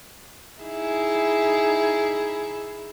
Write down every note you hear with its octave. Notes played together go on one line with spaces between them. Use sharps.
D#4 E4 G#4